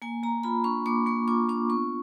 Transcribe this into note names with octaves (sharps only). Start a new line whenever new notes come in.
A#3 G#5
A#3 A#5
F4 B5
D4 C#6
A#3 D6
A#3 C#6
F4 D6
D4 D6
B3 C#6